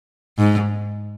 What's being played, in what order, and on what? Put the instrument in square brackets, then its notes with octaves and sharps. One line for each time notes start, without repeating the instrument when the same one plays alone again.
[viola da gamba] G#2